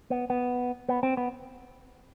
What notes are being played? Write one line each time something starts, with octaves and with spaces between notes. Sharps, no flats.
B3
B3
B3
C4
B3